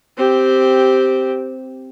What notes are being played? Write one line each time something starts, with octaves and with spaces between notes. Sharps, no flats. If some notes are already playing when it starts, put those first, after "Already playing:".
C4 G4